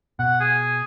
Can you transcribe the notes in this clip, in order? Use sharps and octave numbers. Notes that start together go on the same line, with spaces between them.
B2 F#5
G#4